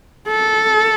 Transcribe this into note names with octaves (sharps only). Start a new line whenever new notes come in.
A4